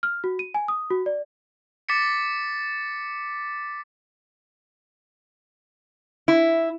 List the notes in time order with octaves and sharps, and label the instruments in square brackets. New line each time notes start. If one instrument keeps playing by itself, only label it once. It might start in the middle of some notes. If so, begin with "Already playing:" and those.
[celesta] F6
F#4
D#7
G#5
D#6
F#4
D5
[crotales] D6 A6 B6 C#7
[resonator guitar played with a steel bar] E4